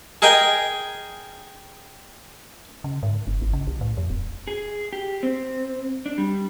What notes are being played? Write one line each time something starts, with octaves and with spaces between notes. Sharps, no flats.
G#4 A#4 D#5 G5 G#5
C#3
G#2
F#1
G#1
C#3
B1
A2
F2
D#1
G#4
G4
C4
D4
G3